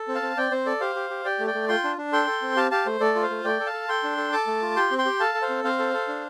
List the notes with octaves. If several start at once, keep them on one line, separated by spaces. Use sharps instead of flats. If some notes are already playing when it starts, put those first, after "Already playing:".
Already playing: A4
C4
F5 A5
C4
C4 D5 G5
C4 C5
A4 D5
G4 C5 F5
G4
G4
G4 D5 G5
A3
D5 G5
A3
F4 G5 C6
D4
D4
A4 G5 C6
A4
C4
G4 F5 A5
G4 F5 A5
A3 C5
A3 A4 D5
F4
C5 F5
A3
A3 D5 G5
A4
F5 A5
A4
A4 G5 C6
D4
A4
A4 A5 D6
A3
F4
G4 G5 C6
C4
G5 C6
G4
A4 F5 A5
A4
C5 F5
C4
C4 C5 F5
A4
A4
D4